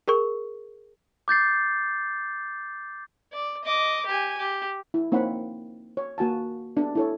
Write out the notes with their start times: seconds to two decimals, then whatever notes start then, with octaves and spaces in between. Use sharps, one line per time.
0.08 G#4 A#4 C#6
1.28 D6 G6 A6 C7
3.33 D5
3.65 D#5 D6
4.06 G4 G#5
4.38 G4
4.94 E4
5.12 A#3 C4 D#4 C#5 F#5 B5
5.97 C#5
6.18 A#3 F#4 G#5 A5
6.77 B3 D4 E5
6.95 E4 A4 C#5